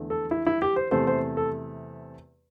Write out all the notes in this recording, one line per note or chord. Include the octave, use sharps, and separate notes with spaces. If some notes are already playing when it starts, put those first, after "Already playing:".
Already playing: E2 D3 A3
A4
E4
E4
G4
C5
E2 C3 A3 C5
C5
A4